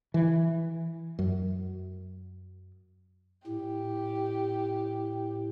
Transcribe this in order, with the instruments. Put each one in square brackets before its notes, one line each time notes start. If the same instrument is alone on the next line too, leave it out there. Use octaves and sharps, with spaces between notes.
[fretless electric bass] E3
F#2
[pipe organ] A2 [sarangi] G4